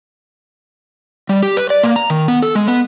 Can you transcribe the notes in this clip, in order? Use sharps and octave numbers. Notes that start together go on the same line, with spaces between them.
G3
G4
B4
D5
A#3
A#5
D#3
B3
A4
G#3
B3